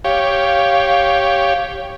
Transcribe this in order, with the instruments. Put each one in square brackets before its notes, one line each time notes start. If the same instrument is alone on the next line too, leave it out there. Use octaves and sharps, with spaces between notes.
[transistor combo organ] G4 C#5 [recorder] F5